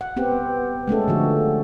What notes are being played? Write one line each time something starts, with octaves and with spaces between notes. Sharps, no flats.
F#5
B3 C4 G4
G#3 A3 C#4 A4
D3 F3 F#4